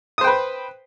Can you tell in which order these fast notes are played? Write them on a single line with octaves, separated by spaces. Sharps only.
D#6 C5 G5 B4